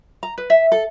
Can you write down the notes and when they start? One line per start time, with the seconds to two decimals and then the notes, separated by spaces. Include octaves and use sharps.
0.23 A#5
0.38 B4
0.50 E5
0.72 A4